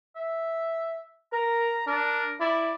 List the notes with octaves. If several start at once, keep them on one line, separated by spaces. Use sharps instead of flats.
E5
A#4 A#5
D4 A#4
E4 D5